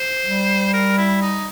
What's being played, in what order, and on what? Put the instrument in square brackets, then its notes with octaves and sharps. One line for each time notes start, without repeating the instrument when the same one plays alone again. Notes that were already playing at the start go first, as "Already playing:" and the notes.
Already playing: [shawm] C5
[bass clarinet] G3
[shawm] A#4
E4
D#4